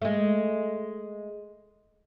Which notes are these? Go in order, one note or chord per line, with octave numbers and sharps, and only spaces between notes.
G#3 A3